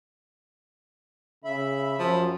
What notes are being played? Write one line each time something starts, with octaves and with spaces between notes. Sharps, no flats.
C#3 E5 B5
F#2 F3